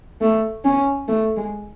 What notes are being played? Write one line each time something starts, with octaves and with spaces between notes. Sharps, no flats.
A3
C#4
A3
G#3